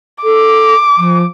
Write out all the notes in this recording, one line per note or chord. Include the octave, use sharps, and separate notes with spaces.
A4 D6
F3